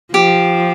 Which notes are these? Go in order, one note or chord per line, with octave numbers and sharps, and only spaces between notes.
F3 G4